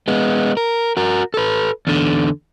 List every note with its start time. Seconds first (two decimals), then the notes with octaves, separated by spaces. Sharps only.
0.08 G#3 B3
0.57 A#4
0.97 F#4 A#4
1.34 A4 B4
1.87 E2 D3